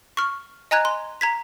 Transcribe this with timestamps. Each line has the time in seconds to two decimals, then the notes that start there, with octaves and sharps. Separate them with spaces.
0.17 C#6 F6
0.71 D#5 G#5 A#5 F#6 G#6
0.85 C6
1.21 A#5 G#6 B6